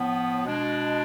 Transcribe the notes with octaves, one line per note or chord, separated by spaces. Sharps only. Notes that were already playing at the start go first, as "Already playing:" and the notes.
Already playing: A2 F3 B3
B2 G#3 D4